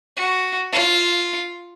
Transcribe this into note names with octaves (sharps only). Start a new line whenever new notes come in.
F#4
F4